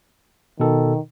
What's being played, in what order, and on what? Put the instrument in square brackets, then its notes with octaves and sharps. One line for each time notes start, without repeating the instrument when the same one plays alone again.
[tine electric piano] B2 A4 [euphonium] D#3